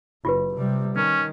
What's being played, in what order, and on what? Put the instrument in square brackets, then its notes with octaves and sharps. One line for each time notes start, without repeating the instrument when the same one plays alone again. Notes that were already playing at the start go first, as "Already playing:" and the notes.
[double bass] F#1 [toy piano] F4 G4 B4
[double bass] C3 G3
[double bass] D#3 [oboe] C#4